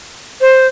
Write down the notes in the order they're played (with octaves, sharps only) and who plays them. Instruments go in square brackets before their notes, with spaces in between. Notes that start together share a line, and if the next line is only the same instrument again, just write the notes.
[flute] C5